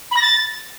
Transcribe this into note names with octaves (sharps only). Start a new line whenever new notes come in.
B5
A#6
A6